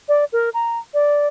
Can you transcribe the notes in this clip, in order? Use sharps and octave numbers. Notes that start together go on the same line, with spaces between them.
D5
A#4
A#5
D5